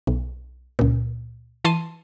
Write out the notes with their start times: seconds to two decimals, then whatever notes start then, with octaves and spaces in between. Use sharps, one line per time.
0.07 B1
0.79 C#2 A#2
1.65 E3 A5 C6 D#7